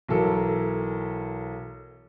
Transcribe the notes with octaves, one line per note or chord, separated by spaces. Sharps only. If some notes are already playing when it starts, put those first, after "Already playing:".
B1 E3 A4 A#4